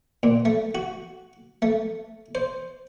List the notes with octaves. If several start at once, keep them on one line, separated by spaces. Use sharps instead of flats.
A#2
A3
F#4
A3
C5